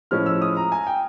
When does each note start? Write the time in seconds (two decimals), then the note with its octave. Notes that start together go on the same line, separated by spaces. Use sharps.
0.11 A2 F3 G#3 C#4 F6
0.26 E6
0.42 D#6
0.57 A#5
0.72 G#5
0.87 G5